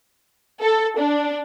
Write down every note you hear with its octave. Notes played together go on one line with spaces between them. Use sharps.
A4
D4